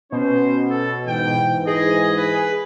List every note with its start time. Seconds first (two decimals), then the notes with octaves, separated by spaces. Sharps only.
0.12 B2 C#4 C5
0.70 A4
1.07 G#2 E3 G5
1.67 G#4 D#5
2.17 B4